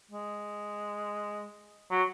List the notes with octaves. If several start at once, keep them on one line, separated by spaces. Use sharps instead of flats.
G#3
F#3